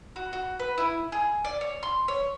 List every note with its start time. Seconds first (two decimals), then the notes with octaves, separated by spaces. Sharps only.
0.16 F#4
0.33 F#4
0.59 B4
0.78 E4
1.12 G#4
1.45 D5
1.61 C#5
1.83 C6
2.08 C#5